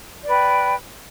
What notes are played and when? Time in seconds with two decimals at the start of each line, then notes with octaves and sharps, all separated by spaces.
0.23 D5
0.27 B4
0.31 G5